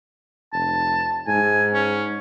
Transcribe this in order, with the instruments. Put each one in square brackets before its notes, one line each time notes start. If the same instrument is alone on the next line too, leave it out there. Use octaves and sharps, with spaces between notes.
[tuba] F1 [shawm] A5
[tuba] G#2 [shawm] G#5
[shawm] C#4